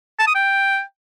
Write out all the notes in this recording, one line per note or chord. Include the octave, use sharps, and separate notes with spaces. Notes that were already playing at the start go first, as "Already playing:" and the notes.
A5
D#6
G5